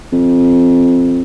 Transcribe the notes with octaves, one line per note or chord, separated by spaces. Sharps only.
F2